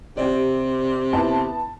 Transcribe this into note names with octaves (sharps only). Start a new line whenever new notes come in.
C3 G4 D5
B3 E4 A5